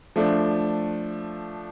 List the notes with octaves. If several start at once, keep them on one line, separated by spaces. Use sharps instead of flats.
F3 A3 D4